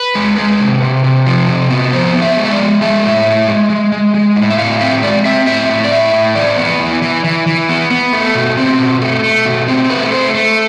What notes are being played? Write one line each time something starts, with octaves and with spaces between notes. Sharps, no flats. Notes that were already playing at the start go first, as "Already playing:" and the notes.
Already playing: B4
G#3
G#3
C3
C3
C3
F3
C3
B3
F3 C5
B3
E5
G#3
E5
D5
G#3
G#3 E5
A2
A2
G#3
G#3
G#3
G#3
A2
E5
A2 F5
C4 E5
G#3 D5
C4 E5
A2 E5
A2
D5
A2 E5
A2
E3 D5
B3
E3
E3
E3
E3
B3
B3
A3
B2
C4
B2
A3
A3
B2
C4
A3 B4
A3 C5
A3